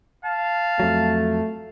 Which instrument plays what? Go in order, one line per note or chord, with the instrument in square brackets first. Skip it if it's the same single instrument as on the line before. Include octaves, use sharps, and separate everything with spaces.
[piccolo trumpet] F5 [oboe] A5
[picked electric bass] F2 F#3 [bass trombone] A3